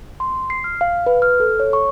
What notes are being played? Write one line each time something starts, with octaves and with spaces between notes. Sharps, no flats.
C6
C7
F6
F5
B4
F6
A4
C#5
C#6